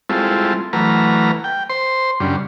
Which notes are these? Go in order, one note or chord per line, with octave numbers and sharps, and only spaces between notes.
G3 G#3 C4 E4 F4 A4
E3 F#3 A3 B4 A#5 F6
G5
C5 C6
F#2 C#3 G3 D4